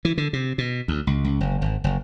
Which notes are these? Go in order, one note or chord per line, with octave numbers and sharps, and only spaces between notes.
E3
D3
C3
B2
D2
C#2
C#2
F#1
G#1
F#1